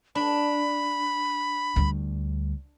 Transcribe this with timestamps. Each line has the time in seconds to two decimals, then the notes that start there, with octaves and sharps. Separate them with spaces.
0.15 D4 B5
1.76 D2 G3